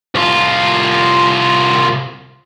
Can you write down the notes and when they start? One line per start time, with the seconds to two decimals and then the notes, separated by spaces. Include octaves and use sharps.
0.15 C2 F4